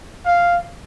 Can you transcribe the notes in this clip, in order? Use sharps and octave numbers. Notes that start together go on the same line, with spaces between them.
F5